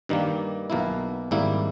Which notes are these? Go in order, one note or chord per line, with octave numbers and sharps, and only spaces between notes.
G2 D#3 G3 A#3
B1 B2 A#3 E4
G#1 G#2 G3 A#3 E4